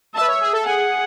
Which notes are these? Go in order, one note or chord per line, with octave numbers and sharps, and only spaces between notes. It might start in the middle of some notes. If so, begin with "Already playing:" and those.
E5 A5
B4
C#5
G#4
A4
G#4 F#5